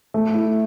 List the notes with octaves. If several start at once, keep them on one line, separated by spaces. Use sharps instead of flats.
A3
E4